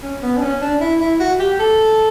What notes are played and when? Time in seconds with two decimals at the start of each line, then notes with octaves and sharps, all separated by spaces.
0.02 C#4
0.22 B3
0.37 D4
0.41 C#4
0.61 D4
0.81 E4
1.00 E4
1.20 F#4
1.39 G4
1.60 A4